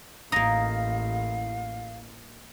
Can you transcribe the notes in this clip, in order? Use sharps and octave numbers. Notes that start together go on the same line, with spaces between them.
A1 A#3 D#4 F5 D#6 A#6